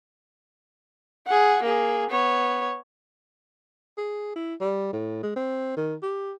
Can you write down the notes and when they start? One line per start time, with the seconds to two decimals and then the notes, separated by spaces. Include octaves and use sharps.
1.27 G#4 F#5
1.63 A#3 G#4
2.10 B3 C#5
3.98 G#4
4.36 E4
4.60 G3
4.93 A2
5.23 G#3
5.36 C4
5.77 D#3
6.02 G4